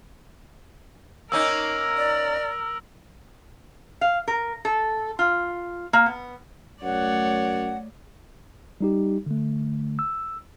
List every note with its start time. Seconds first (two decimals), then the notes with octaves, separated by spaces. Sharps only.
1.32 A#3 C#4 D#4 A#4 E6
1.97 D5
4.01 F5
4.28 A#4
4.65 A4
5.19 F4
5.93 A#3
6.06 B3
6.83 F#2 A3 C#5 D5 F#5
8.81 G3 D#4 G4
9.26 D3 A3
9.99 E6